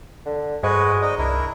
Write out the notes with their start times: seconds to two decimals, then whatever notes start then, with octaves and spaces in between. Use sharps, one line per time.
0.26 D3
0.63 G2 G#3 F#4 B4 C5
1.02 D#4 D5 D#5
1.18 C2 D4 E4 A#4